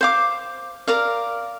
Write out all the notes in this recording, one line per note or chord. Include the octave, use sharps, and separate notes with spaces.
C5 F5 D6
A#4 D5 F5